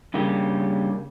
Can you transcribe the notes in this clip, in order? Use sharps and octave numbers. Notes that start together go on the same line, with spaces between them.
G2 C#3 A#3 G4